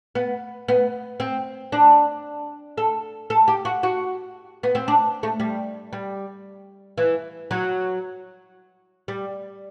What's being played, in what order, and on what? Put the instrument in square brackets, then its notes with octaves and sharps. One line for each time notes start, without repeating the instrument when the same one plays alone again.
[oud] B3
B3
C4
D4
A4
A4
G4
F#4
F#4
B3
C4
D4
A3
G3
G3
E3
F#3
G3